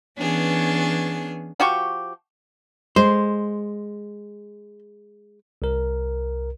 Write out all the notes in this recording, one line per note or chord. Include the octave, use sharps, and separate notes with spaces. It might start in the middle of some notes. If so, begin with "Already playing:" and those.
E3 B3 C#4 D4 G#4
F3 F#4 G4 C#6
G#3 C5
C2 A#4